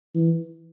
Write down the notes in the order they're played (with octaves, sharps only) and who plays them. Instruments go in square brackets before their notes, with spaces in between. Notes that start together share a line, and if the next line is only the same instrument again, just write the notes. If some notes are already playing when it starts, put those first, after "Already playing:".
[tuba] E3